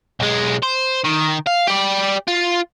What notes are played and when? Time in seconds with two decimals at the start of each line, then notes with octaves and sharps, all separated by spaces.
0.20 B1 G#3
0.63 C5
1.05 D#3
1.46 F5
1.67 G4 D5
2.28 F4